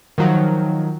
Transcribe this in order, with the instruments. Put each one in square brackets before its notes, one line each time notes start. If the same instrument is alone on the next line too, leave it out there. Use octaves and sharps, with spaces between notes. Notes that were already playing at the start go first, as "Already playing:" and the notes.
[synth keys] D#3 F3 F#3